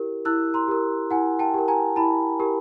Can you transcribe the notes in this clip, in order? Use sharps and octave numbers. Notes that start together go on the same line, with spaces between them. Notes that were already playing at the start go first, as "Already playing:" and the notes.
Already playing: E4 G4 A#4
E4 E6 F#6
A#5 C6
G4 A#4
E4 F#5 G#5
G5 A5
G4 A#4
G#5 A#5
E4 A5 B5
G4 A#4